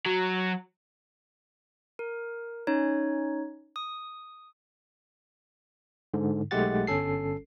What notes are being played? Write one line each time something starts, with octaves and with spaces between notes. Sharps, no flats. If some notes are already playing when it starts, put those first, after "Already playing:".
F#3
A#4
C#4 D#4 C#5
D#6
G#2 D3
B1 G#3 A3 G4 F#5 A6
G1 C#4 A4 C7